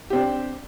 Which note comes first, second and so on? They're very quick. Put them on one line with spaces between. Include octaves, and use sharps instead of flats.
G4 C4 D4